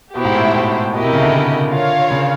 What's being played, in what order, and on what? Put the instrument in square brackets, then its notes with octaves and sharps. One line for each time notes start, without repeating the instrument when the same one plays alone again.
[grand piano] B2 [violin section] E4 G4 C5 E5
[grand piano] G#2
A2
G#2
A2
[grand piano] B2 [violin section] E4 G4 A#4 D#5
[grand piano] C3
C#3
D3
[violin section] F4 A#4 C#5 F5
[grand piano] C#3